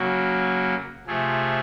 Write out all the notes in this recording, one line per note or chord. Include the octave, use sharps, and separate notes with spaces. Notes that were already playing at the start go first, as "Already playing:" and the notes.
Already playing: C#3 F#3 A#3
C3 F3 A3 G#4